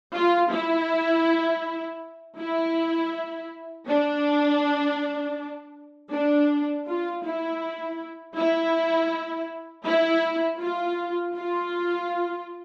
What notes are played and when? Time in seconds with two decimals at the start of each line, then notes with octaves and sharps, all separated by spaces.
0.15 F4
0.52 E4
2.39 E4
3.88 D4
6.12 D4
6.87 F4
7.25 E4
8.37 E4
9.86 E4
10.61 F4
11.36 F4